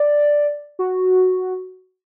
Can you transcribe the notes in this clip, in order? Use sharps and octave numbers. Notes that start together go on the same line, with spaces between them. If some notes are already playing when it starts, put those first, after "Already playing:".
Already playing: D5
F#4